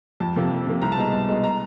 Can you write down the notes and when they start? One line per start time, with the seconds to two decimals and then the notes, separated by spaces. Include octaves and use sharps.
0.20 F2 A5
0.36 C3 F3 A#3
0.51 F2
0.67 C3 F3 A#3
0.82 C2 A#5
0.92 A5
0.97 B2 G#3 A#5
1.13 C2
1.29 B2 G#3
1.44 A#5